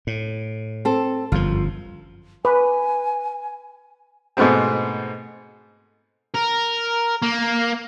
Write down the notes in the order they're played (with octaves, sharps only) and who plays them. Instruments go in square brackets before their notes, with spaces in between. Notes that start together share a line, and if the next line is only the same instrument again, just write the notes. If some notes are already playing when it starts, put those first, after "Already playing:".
[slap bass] A2
[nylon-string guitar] C4 A4
[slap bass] G1 F#2 F3 [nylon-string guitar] F4
[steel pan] B4 [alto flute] G#5
[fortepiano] G#2 B2 A3 B3 C4
[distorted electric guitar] A#4
A#3